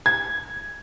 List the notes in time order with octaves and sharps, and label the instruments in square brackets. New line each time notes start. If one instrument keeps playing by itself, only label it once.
[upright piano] G#6